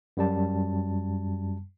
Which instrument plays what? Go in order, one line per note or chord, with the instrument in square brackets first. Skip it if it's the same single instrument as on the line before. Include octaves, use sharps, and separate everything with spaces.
[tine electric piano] F#2 G3 A5